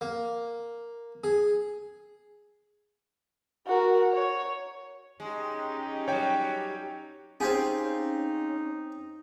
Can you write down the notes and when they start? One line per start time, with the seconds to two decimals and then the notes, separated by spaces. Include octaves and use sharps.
0.01 A#3
1.24 G#4
3.66 F#4 A#4
4.12 C#5
5.20 G#3 C#4 D#4 G4
6.08 F#3 G3 C#5 G5
7.40 C4 C#4 D#4 F4 G4 G#4